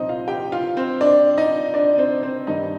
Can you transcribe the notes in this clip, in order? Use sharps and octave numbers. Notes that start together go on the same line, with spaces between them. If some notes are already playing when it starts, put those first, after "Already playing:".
Already playing: C2 A#2 F3 C4 D#4 C5 D#5
F4 F5
G4 G5
F4 F5
C4 C5
D4 D5
D#4 D#5
D4 D5
C4 C5
C4 C5
G2 D#3 G3 D#4 D#5